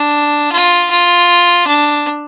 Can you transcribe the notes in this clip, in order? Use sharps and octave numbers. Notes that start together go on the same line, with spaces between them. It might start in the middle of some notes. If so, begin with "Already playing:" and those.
Already playing: D4
F4
F4
D4